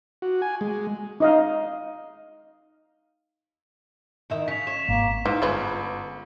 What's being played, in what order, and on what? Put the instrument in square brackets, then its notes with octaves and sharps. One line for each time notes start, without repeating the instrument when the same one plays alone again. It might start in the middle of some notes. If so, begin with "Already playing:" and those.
[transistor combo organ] F#4
G#5
G#3
[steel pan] D#4 D#5 F5
[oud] E2 D#3 E5
[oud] C#3 C#4 [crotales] B6 F7
[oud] C#5 [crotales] E7
[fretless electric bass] G#1 [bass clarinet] A#3
[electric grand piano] G#2 [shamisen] E3
[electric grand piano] G1 [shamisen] C#3 F4 B4